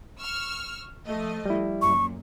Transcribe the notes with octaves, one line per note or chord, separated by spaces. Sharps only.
C#6 E6 F6
F3 A3 D#5
G3 E4
F#2 A#2 C#6